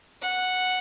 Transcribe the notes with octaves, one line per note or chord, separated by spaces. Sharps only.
F#5